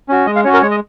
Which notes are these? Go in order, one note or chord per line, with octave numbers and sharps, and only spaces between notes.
C#4 F#4
G#3 D#5
F5
C#4 F#4 C#5
A#4
G#3 C#5
D#5